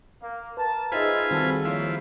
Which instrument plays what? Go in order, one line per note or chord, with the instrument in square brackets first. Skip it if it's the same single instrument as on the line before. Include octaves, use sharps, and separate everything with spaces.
[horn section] A#3
[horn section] A#4 A5 [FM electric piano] B4
[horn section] D#4 E5 [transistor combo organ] F4 G#5 B5 [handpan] G#4 C5
[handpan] D#3 G3 [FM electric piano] C4 [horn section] F#4 G#4 A4
[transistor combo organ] F3 E4 [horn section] A#3 C#5